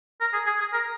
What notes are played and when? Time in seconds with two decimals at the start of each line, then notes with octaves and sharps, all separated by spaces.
0.20 A#4
0.33 G#4
0.46 G#4
0.60 G#4
0.73 A#4